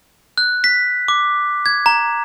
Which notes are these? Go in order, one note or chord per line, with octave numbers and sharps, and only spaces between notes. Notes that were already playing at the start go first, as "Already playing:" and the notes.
F#6
B6
D6
G#6
A#5